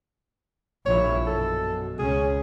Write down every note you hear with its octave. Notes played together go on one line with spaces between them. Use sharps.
A#1 E4 C#5
F#2 B2 A4
C#2 C#4 G#4